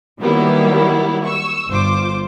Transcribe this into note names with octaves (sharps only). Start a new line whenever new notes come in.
D#3 F#3 G3 A#3 B3 E4
C#6 E6
G1 F4 C5 D6